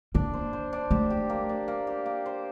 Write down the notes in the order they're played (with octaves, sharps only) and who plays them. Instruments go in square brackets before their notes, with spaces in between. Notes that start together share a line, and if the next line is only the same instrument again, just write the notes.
[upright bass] A#3 [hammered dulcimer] D4
[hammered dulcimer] C5
C5
D4
[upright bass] A3 [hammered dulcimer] G4
[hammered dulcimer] G4
A#3
D4
A#3
G4
A#3
C5